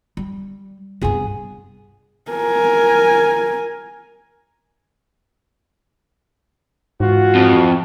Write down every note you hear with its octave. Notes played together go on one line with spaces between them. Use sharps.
G3
G2 C3 B3 G#4
A#4 G#5
G#2 E3 F4 F#4
F2